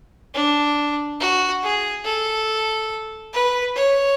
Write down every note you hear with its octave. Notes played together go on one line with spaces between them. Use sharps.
D4
F#4
G#4
A4
B4
C#5